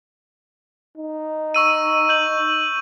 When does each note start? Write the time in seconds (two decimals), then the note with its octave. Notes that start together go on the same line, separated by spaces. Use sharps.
0.97 D#4
1.54 C#6 E6 D#7
2.09 G6 F#7